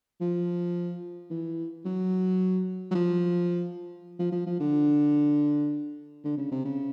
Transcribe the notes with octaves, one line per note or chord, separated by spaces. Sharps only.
F3
E3
F#3
F#3
F3
F3
F3
F3
D3
D3
C#3
C3
C#3